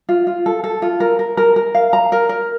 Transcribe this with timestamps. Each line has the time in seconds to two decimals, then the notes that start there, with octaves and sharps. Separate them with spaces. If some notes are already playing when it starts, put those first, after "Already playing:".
0.09 F4
0.27 F4
0.46 A4
0.64 A4
0.82 F4
1.00 A#4
1.19 A#4
1.37 A#4
1.56 A#4
1.75 F5
1.93 A#5
2.12 A#4
2.29 A#4